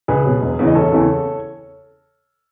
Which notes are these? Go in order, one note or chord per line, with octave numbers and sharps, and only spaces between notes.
C#2 G#4 B4
B2 F#3
E1
E2 C#3 E3
D#5
E1 A4 C#5
E2 C#3 E3